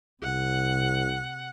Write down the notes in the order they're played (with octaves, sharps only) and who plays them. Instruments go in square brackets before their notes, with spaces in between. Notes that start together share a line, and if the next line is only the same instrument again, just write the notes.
[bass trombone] C2 [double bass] C3 [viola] F#5